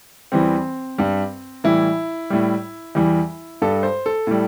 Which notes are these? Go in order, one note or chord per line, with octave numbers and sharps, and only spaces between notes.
E2 E3 G3 C4
G2 G3
A2 E3 G3 E4
A2 G3
E2 E3 G3
G2 G3 A4
C5
A4
A2 G3